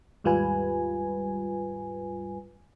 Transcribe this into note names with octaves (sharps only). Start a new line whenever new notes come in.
D#2 G#2 G3 F4 B4 G#5